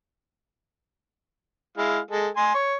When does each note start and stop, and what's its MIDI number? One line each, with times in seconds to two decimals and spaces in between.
1.78 1.99 56
1.78 1.99 64
1.78 1.99 77
2.11 2.28 56
2.11 2.28 69
2.37 2.53 80
2.37 2.53 84
2.55 2.76 73